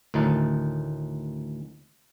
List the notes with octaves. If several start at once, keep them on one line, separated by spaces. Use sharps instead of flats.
D2 A2 D#3 D#4 A5